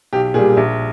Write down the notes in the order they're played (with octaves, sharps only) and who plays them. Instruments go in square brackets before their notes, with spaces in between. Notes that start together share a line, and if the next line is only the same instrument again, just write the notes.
[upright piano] B1 G4
A#2 G#4
G3
A#1